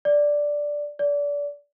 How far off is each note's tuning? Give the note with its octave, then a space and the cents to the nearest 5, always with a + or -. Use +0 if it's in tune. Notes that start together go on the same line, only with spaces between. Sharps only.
D5 +0
D5 -30